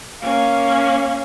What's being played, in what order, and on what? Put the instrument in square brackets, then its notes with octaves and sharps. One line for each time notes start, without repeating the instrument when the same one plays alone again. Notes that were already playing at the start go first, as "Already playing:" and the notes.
[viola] A#3 C#4 [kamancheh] F5